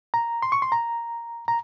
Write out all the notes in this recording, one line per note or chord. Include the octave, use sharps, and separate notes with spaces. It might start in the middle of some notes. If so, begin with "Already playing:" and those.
A#5
C6
C#6
C6
A#5
A#5